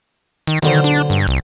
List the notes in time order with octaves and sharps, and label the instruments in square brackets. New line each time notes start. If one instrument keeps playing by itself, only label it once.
[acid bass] D#3
[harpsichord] B1 D3 C5 [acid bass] D#3
[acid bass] D4
G2
C2